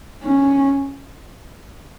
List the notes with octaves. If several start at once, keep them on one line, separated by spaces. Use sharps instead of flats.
C#4